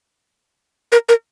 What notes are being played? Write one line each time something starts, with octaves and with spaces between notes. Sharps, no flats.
A#4
A#4